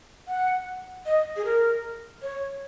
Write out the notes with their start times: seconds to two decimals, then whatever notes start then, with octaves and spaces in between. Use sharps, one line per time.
0.28 F#5
1.06 D#5
1.37 G#4
1.45 A#4
2.22 C#5